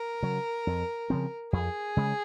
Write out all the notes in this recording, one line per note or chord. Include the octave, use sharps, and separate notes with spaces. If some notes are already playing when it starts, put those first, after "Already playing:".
Already playing: A#4
C#3 F#3
F2
C#3 F3 C4
F2 G#4
C#3 G#3